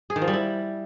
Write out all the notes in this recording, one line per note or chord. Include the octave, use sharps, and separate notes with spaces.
G#4
D#3
F3
G3
E4